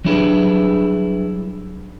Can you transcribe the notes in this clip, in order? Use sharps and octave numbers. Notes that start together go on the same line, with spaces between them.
F#3 G3 D4 E4 G#4 B4